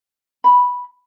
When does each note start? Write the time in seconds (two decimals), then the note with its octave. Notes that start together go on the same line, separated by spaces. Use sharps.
0.44 B5